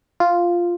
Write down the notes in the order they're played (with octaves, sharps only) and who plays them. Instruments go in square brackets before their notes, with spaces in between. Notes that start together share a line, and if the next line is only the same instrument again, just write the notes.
[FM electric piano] F4